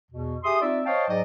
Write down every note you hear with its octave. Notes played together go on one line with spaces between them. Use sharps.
E2 B2
G4 G#4 E5 C6 D#6
C4 D#4 F4 D5 E5
C5 C#5 D#5 F5 G5 A5
G#2 F#3 G#4 D5 D#5